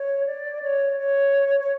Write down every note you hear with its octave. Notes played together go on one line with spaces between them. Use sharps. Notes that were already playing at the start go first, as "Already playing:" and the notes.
Already playing: C#5
D5
C#5
C#5
C#5